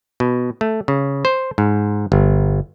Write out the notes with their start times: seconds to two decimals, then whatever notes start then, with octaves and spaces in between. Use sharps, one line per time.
0.20 B2
0.61 A3
0.88 C#3
1.25 C5
1.58 G#2
2.12 G1